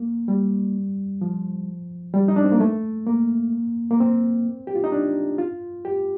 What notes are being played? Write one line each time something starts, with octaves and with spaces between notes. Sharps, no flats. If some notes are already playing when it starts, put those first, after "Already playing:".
Already playing: A#3
G3
F3
G3
D#4
D4
C4
A#3
A3
A#3
A#3
C4
G4
F4
D#4
D4
F4
G4